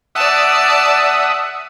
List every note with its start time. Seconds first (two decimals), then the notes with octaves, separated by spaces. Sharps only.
0.15 D5 E5 F#5 A5 D#6